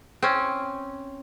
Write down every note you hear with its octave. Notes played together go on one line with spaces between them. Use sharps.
C4 C#4